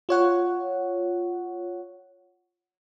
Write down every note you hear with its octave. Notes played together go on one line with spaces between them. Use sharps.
F4 C#5 F#5